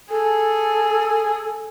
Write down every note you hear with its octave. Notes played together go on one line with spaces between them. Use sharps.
G#4 A4